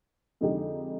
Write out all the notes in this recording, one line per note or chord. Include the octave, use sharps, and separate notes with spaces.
F2 D3 G#3 D#4 G4